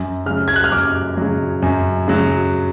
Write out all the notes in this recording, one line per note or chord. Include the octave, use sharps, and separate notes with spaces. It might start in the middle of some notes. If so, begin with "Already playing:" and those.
Already playing: F#2
C#3 F#3 F6
G#6
F#6
F6
F#2 D6
C#3 F#3
F#2
C#3 F#3